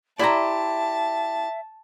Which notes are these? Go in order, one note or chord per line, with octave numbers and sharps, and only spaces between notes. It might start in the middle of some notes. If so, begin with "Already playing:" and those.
E4 G4 C5 D5 E5 A5 A#5